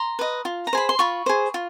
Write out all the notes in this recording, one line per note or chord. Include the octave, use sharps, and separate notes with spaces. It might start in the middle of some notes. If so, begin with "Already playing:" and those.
Already playing: A#5 C6
B4 D#5
F4
A#5
G#4 C5 B5
C6
F4 B5 C#6
G#4 C5
F4